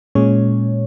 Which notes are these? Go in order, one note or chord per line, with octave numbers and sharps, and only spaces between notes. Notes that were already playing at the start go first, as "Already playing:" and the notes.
A#2 G#3 C#4 C#5